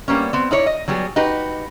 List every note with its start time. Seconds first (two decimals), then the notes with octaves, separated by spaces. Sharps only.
0.08 G3 A#3 B3 C#4
0.33 B3 C4
0.51 D#4 E4 C#5 D5
0.66 D#5
0.88 F#3 G3 B3 G#4
1.16 D#4 F#4 G4 B4